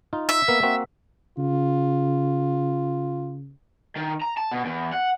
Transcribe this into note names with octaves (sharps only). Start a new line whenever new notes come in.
D#4 F4
E5
A#3 B3 F5
A#3 C4 F#4
C#3 F4
D#3
A#5
A5
B2
E2
F#5